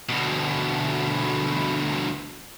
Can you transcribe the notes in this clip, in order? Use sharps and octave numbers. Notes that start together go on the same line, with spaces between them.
D2 B2